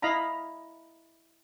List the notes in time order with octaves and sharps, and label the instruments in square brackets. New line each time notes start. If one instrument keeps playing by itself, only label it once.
[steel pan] E4 D#5 F5 A#5 B5